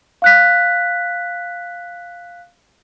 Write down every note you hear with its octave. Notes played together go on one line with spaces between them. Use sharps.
F5 F#6 B6